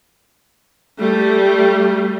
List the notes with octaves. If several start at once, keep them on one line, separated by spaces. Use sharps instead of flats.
G3 A3